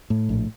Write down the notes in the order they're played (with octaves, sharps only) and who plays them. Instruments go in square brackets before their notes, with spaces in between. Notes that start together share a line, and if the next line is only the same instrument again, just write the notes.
[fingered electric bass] A2
A#1